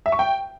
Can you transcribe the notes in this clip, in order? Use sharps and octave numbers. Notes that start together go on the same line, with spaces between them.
E5
C#6
G5